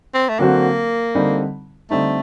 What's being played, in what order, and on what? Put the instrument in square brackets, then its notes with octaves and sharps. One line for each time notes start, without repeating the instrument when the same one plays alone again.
[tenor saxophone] C4
A3
[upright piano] D3 F#3 C4 F#4 [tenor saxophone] A#3
[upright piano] D3 G3 C4 D#4
[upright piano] D3 G3 C4 D#4 [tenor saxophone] A3